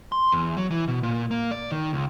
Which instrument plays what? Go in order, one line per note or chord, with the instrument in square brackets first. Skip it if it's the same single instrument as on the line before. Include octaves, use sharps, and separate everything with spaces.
[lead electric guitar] C6
E2
F#3
E3
B2
A#2
A#3
D5
D#3
C#2